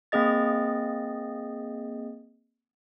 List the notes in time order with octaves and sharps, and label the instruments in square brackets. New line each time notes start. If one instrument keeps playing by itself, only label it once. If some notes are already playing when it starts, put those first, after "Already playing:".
[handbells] A#3 C4 G#4 D#5 A6